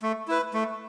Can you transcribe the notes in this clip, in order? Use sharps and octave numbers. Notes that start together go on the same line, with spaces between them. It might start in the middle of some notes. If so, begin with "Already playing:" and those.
A3
E4 B4
A3